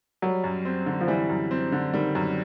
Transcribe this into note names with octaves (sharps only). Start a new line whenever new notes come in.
F#3 G3
F#2
C4
D3
F3
E3 G3
F#2
C4
D3
D#3 G3
F#2